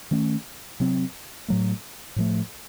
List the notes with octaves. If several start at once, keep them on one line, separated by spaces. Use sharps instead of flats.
D#3 A3 C#4
C3 F#3 C4
A2 F#3 A3
A2 F3 A3